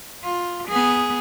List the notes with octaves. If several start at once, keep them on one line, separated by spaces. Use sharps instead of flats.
F4
B3 G#4